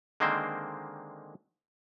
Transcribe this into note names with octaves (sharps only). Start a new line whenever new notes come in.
D3 D#3 G#3 A#3 C4 C5